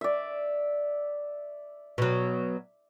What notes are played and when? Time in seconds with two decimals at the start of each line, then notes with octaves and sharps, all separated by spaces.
0.01 D5 E5
1.98 B2 F#3